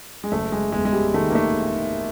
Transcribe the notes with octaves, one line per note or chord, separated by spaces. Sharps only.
G#3
F#1 A3
G#3
E2 G#3
G#3
G3
D#3 A3
A#3
A3